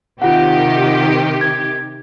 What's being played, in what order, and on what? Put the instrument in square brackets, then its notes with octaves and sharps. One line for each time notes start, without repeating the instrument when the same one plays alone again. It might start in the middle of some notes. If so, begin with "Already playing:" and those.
[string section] C3 D#3 G4 [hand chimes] F4 F#5
[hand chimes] G#6